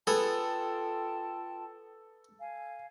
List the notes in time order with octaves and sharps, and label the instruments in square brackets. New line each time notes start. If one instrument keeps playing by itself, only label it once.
[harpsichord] B3 G#4 [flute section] F4 G5 A5 [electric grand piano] A4
[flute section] F5 G#5